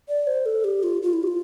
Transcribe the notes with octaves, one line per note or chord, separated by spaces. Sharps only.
D5
C5
A4
G4
F4
F4
E4
G4
F4